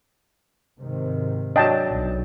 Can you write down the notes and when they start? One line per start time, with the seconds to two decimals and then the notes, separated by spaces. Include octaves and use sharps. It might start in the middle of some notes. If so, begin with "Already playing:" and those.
0.79 G#2 C3 D#3
1.56 F#3 D4 D#5 G5 A5
1.89 B1